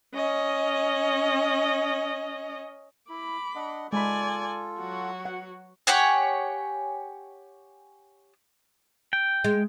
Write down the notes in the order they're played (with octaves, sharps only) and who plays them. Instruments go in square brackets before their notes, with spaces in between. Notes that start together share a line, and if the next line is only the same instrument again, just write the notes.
[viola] C#4 D#5
[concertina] E4 [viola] B5 D6
[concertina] D4 D#5 F#5
[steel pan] G#3 B5 [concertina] F4 A4 [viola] D5 G#5
[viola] F#3 F#4
[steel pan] F#5
[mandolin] G4 C#5 F#5 G#5
[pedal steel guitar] G5
[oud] G#3